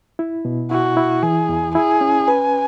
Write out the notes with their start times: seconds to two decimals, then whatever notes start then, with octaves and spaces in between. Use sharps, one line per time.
0.19 E4
0.45 B2
0.71 E4 F#4
0.97 E4
1.23 E3 G#4
1.49 E2
1.75 E4 G#4
2.01 C#4
2.27 B4 G#5